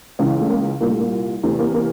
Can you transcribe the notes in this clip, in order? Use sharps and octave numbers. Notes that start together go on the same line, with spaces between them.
C#2 C#3 E3
A3
A#3
C2 A#2 A#3
A3
A#3
E2 C3 E3 A3
A#3
A#3